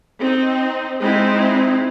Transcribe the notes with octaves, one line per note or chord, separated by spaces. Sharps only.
C4 D#4
G#3 C4 D#4 E4